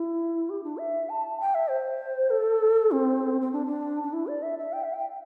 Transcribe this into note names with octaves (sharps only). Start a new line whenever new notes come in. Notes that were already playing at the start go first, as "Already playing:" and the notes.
Already playing: E4
G4
D4
E5
A5
G5
E5
C5
A4
C4
C4
D4
D4
D4
E4
D5
E5
E5
G5
E5
G5